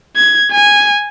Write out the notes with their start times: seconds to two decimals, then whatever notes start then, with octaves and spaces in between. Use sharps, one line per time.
0.16 G#6
0.52 G#5